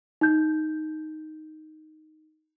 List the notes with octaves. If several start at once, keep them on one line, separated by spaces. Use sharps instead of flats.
D#4 G6